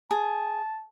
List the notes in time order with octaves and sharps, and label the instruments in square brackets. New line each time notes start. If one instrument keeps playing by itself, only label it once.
[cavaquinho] G#4 [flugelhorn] A5